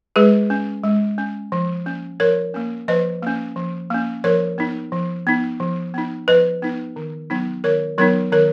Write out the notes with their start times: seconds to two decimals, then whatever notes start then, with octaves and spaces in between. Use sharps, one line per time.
0.16 G#3 G#4 B4
0.50 C#4
0.84 G#3
1.18 C#4
1.52 F3
1.86 A#3 C#4
2.20 F3 A#4 C#5
2.54 A#3 C#4
2.88 F3 B4 D#5
3.22 A#3 C#4
3.56 F3
3.90 A#3 C#4
4.24 F3 A#4 C#5
4.58 B3 D#4
4.92 F3
5.27 B3 D#4
5.60 F3
5.94 B3 D#4
6.28 F3 B4 D#5
6.62 B3 D#4
6.96 D#3
7.30 F#3 B3 D#4
7.64 D#3 A#4 C#5
7.98 F#3 B3 D#4 A#4 C#5
8.32 D#3 A#4 C#5